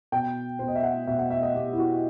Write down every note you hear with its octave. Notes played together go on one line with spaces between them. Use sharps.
B2 G5
B2 C5
D#5
E5
F#5
B2 E5
F#5
E5
D#5
B2 G4
E4
F#4